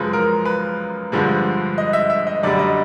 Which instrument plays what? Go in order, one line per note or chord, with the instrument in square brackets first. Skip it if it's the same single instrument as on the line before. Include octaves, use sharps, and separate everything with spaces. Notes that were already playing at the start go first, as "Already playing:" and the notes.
Already playing: [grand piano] F#2 C#3 F3 G#3 B4
A#4
B4
G2 D3 F3 G#3
D#5
E5
E5
D#5
F#2 D3 G3 D5
D#5